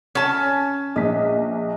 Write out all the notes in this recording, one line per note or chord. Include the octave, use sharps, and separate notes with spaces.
C#4 A5
A#1 D#5 B6